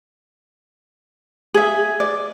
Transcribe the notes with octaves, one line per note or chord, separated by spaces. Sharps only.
G#4 E5
D5